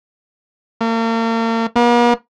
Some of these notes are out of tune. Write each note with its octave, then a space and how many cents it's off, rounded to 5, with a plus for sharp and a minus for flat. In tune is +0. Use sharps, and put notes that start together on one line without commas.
A#3 -40
A#3 +45